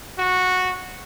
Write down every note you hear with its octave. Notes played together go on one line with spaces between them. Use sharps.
F#4